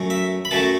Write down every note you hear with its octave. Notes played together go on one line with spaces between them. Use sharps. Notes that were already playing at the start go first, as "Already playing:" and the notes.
Already playing: F#2 F#3 A3
E5
B5
F#2 F#3 A3 A5